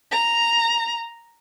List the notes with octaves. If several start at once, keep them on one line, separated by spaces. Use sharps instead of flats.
A#5